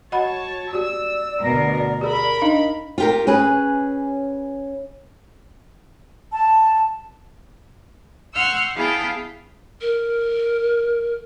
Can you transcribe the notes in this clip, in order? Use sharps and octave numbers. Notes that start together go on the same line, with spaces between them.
F#4 C#5 D#5 F#5 A5 B5
F#4 G4 D5 E6
D2 B2 A#4
G4 G#4 A#4 B5
D4 D#4 D#5 F5
F4 G4 A#4
C#4 G#4 B4
A5
F#5 C6 C#6 E6 F6 G6
B3 E4 G#4 F5 G5 A5
A#4